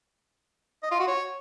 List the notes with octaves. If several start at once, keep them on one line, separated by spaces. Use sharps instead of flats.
D#5
F4
F#4
C#5